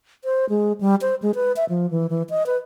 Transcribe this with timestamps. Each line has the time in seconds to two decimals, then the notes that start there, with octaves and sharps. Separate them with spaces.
0.24 C5
0.50 G#3
0.81 G3
1.01 C5
1.22 G#3
1.35 B4
1.56 E5
1.69 F3
1.91 E3
2.10 E3
2.30 D#5
2.46 B4